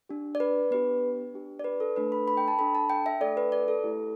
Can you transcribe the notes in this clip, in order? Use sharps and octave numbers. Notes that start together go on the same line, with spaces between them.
D4 G4
D5
B4
B3 D4 G4 B4
D4 G4
D5
B4
A4
A3 D4 A4 B4
B5
B5
G5
A5
D4 A4 B5
A5
G5
E5
A3 D4 A4 D5
B4
D5
A4
A3 E4 G4